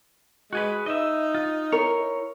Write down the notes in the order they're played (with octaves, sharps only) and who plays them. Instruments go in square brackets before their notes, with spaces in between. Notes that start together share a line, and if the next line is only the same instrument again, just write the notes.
[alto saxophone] G#3 [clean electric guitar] F#4 G#4 B4
[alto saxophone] D#4 [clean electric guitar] D#5 E5
[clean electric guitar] F4
[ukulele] E4 A#4 [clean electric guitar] C#5